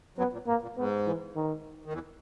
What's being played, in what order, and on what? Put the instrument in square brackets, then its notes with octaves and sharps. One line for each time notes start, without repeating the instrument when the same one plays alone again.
[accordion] F#2 F#3 [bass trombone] B3
[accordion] A#2
[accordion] G#2 [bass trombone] A#3
[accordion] A#2
[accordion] G#2 [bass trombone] B3
[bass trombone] E3
D#3
[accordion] D#3
E2 E3